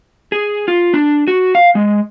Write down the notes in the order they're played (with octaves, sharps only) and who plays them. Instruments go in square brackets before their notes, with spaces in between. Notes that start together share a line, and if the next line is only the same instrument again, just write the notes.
[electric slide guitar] G#4
F4
D4
F#4
F5
G#3